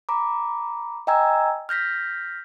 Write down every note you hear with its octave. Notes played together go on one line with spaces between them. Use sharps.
A#5 B5 D6
D#5 G5 G#5 A#5 E6 G#6
F6 G6 A#6 B6